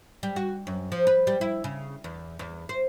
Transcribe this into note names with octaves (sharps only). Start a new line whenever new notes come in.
G3
F#4
F#2
F3
B4
G3
E4
C#3
E2
E2
C5